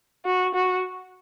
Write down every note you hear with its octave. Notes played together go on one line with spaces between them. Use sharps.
F#4
F#4